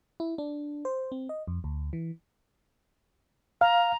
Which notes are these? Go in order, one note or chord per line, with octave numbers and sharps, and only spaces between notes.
E4
D4
C5
C4
D#5
F2
D2
E3
F5 A#5